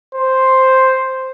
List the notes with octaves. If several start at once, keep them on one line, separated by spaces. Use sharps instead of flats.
C5